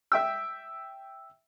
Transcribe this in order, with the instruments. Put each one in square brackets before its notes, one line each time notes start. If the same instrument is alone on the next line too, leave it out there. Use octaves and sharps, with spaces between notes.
[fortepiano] E5 G5 E6